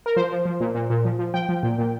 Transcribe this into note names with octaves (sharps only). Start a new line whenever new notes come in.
A#4
F3 C5
F3
F3
A#2
A#2
A#2
F3
F3
F3 G5
F3
A#2
A#2